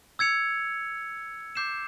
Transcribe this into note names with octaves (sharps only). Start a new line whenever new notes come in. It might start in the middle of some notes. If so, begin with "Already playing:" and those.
E6 G#6 C#7 F7
D6 G6 C7 E7